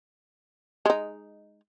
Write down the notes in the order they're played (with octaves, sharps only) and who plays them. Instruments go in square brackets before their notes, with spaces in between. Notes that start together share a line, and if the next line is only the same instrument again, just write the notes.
[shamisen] G#3 D#4